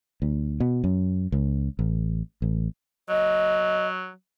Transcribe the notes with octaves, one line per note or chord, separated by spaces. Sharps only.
D2
B2
F#2
C#2
A1
A1
F#3 D#5